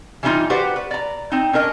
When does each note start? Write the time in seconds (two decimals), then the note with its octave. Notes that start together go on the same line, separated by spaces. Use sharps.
0.23 E3 G3 A3 C#4 D#4 F4
0.50 F#4 G4 B4 C5 D5 F#5
0.76 B4
0.91 D5 A#5
1.32 C4 D#4
1.53 C#4 D4 A#4 D#5